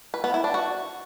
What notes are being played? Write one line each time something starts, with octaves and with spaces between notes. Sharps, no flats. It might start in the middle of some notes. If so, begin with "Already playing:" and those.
B4
B3
E4
D4
F#4